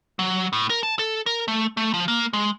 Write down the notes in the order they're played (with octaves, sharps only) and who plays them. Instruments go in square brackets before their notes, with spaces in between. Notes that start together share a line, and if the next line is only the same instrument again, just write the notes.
[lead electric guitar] F#3
A2
A#4
A5
A4
A#4
A3
A3
F3
A#3
G#3